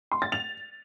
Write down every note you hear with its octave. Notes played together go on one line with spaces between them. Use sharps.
C6
A6
F7